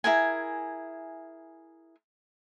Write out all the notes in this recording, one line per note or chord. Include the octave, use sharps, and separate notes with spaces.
E4 G#4 A#4 G#5